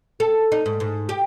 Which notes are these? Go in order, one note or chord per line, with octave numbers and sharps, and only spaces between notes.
A4
D#4
G#2
G#2
G4